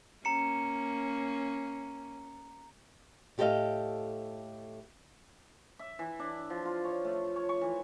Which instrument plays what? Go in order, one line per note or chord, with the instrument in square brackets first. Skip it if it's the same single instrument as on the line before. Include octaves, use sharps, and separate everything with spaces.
[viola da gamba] A#3 C#4 [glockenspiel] A#5 C#7
[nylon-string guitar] A2 G4 A4 B4 D#5 F5
[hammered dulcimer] E5
E3
D4
F3
F4
C#5
A3
C#5
C#6
E3